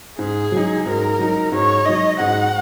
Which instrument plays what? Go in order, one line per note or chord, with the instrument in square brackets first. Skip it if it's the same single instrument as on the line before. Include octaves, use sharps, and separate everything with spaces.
[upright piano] G#2 [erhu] G#4
[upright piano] F#3 D#4
[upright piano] G#2 [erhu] A#4
[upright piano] F#3 D#4
[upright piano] G#2 [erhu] C#5
[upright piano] F#3 D#4 [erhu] D#5
[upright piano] G#2 [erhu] F#5